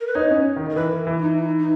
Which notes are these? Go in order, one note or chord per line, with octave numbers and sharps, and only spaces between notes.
A#4
B4
D#4 C#5
C#4
D#3
D#3 A#4
E3 B4
A#4
E3
E4
D#4
E4
D#4
D#4